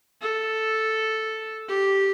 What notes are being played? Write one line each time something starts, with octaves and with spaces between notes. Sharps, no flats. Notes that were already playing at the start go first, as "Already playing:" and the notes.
A4
G4